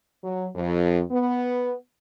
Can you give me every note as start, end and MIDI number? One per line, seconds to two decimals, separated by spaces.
0.23 0.46 54
0.55 1.01 41
1.11 1.74 59